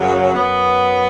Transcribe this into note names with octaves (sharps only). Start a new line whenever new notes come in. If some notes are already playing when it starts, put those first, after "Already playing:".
Already playing: F#2 C#3 F#3
F#2 F#3 B3